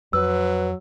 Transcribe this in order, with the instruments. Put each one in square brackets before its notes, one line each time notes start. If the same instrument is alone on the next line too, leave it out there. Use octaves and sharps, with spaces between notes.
[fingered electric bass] F2 [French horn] F#3 [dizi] B4 [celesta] E6